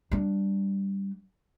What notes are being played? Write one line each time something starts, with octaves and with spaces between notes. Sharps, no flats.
G3 D4